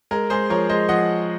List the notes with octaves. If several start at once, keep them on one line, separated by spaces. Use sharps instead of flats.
G#3 A#4
G#3 G#4 C5
F3 A#4 C#5
G#3 C5 D#5
F3 D#5 F#5